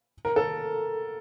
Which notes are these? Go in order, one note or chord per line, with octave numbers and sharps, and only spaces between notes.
A#4
A4